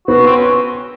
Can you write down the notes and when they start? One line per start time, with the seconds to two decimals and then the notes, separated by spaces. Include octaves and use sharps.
0.08 B3 F#4
0.25 C4
0.36 C#4